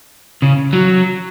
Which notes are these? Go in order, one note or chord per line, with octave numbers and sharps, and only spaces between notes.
C#3
F#3